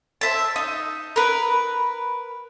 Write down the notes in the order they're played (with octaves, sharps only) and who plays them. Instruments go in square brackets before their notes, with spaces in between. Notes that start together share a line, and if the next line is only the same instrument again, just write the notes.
[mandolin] C5 E5 A5
D#4
A#4 B4